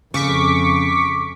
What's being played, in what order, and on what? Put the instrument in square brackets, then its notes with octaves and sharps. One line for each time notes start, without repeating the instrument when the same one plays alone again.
[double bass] F2 [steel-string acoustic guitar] C#3 [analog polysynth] C#6 D6 B6